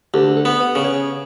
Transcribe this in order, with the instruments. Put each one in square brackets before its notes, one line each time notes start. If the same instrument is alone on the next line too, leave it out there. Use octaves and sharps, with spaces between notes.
[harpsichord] D2 [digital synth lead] G4
[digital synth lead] A4
[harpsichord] B3
[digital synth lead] B4
[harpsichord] C#3
[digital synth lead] C#5